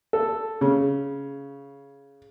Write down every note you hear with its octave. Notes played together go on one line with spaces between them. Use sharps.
A4
C#3